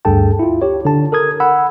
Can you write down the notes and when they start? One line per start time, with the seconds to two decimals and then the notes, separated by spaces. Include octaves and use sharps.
0.05 D2 G2 G#4 A4 G5 A5
0.39 E4 F4
0.62 G4 C#5
0.85 D3 A5
1.12 A4 A#4 D#6 G#6
1.40 F#5 B5 E6